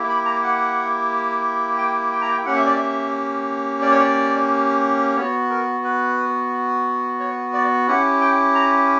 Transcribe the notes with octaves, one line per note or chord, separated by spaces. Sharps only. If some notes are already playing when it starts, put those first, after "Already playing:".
Already playing: A#3 E4 G4
B5
A#5
F#5
G5
G5
A#5
G5
A#3 C#4 G4 F#5
E5
D5
E5
D5
C#5
D5
B3 F#4 C#5
A#4
B4
C#5
D5
C#4 E4 G4 F#5
G5
A#5